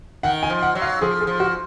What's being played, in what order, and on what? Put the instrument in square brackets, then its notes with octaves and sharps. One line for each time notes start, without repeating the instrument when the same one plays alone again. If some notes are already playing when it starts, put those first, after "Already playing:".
[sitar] D#3 [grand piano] F#5
[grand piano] G#5
[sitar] F3
[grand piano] F#5
[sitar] F#3
[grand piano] F5
[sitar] F3 [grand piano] G#4
[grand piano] G#4
[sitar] F3
[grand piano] F#4